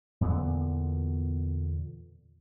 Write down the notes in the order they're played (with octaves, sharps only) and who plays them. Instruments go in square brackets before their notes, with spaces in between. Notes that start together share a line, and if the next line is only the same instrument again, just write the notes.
[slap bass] E2 A#2 D3 B3